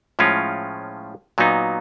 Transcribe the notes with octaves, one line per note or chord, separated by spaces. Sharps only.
A2 F3 G#3 C#4 F4
A#2 F#3 B3 D#4